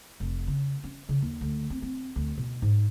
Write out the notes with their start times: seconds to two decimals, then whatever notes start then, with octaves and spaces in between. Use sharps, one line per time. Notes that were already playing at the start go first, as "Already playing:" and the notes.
0.20 F1
0.47 C#3
0.84 C#4
1.09 C#3
1.22 D#2
1.41 D2
1.70 C4
1.82 C4
2.16 D2
2.38 B2
2.62 G#2